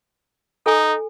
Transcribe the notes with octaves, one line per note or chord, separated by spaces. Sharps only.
D#4 A4 G#5